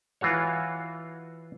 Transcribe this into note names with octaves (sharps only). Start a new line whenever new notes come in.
E3 F4 F#4 C#5